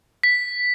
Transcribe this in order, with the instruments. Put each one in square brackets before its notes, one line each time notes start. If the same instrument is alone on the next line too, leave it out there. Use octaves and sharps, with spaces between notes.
[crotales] B6